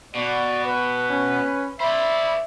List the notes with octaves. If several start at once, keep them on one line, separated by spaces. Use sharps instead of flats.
B2 F#4 D5
B4
C#4
C5 D5 E5 B5